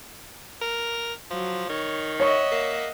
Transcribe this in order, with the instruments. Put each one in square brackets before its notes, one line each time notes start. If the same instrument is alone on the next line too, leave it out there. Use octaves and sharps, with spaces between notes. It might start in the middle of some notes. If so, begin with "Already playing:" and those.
[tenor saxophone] A#4
[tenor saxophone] F3 [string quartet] F#3
[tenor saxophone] D#3 [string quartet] C#5
[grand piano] C#5 C#6 [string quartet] D#5 E5 F#5
[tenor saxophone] A#3